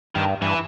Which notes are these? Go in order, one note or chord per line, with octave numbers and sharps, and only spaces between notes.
G2 D#3
G2 E3